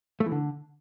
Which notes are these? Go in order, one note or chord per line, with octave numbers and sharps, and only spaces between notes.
A3
E3
D3